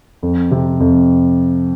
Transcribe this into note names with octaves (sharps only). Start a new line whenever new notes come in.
F2
C3
F2